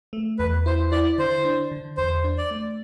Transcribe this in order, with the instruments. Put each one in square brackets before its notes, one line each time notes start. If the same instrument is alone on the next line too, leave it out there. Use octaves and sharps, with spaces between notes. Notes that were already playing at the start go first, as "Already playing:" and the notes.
[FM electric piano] A3
[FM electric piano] E2 [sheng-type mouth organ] B4
[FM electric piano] E4 [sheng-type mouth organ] C5
[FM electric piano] E4 [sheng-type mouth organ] D5
[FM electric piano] D3 [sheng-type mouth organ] C5
[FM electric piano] D4
D3
[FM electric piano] E2 [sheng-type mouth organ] C5
[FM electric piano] D4
[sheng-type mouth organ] D5
[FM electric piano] A3